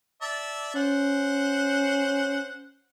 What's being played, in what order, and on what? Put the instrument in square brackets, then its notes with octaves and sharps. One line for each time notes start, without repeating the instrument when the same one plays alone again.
[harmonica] D5 E5 A5
[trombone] C#4 [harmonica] C5 F#5